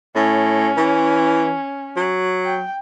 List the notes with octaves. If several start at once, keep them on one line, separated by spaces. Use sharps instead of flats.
A2 C#4
E3
F#3
G5